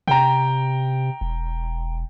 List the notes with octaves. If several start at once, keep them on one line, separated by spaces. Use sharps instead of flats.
C3 G5 A#5
E1